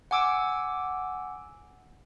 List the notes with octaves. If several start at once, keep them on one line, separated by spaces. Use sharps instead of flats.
F#5 G#5 D6 E6 D7